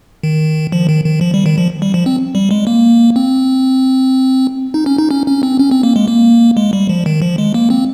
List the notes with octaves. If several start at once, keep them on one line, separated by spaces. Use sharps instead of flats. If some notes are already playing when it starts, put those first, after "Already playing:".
D#3
F3
D#3
D#3
F3
G3
D#3
F3
G3
F3
C4
G3
G#3
A#3
C4
D#4
C#4
D#4
C#4
C#4
C4
C#4
C4
A#3
G#3
A#3
G#3
G3
F3
D#3
F3
G#3
A#3
C4